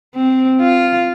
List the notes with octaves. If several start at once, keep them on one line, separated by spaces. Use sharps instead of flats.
C4
F4